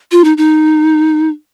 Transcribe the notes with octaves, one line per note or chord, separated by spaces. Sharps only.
F4
D#4
D#4